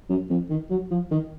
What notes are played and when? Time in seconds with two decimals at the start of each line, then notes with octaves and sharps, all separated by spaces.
0.10 F#2
0.30 F2
0.50 D#3
0.70 F#3
0.91 F3
1.11 D#3